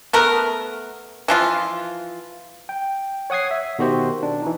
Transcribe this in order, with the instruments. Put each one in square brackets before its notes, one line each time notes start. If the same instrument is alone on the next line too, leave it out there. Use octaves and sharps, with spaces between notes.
[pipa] A3 B3 A#4
E3 F3 F4
[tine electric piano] G5
C#5 F#5 D#6 G#6 C7
E5
B2 D#3 F#4 G4 C5
D4
E3 D#4